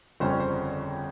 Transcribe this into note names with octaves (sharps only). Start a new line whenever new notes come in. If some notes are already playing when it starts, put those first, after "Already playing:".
G1 F2 C#3 G3 C#4 C5
C#5
C5